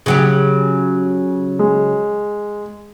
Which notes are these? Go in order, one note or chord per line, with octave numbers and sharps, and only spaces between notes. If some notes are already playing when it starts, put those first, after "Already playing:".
C#3 F#3 G4
G#3